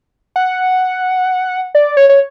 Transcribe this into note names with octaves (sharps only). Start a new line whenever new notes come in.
F#5
D5
C#5
C#5